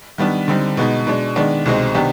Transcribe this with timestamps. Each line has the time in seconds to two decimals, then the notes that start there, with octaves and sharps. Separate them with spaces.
0.18 D#3 G3 B3 D4
0.48 D3 G3 C4 D#4
0.77 B2 G#3 B3 D#4
1.07 B2 G#3 D4
1.36 D#3 G#3 B3 D4
1.66 C2 B2 G#3 C4 D#4
1.95 C3 D#3 B3 D4 G4